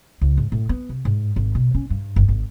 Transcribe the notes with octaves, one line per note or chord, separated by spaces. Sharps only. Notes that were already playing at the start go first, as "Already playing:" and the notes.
C#2
G#2
A2
B3
C3
G#2
G#1
B2
C#4
G2
G1
G#1